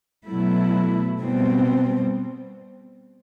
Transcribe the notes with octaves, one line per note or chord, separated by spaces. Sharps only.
B2 F#3 A3 E4
B2 G3 C4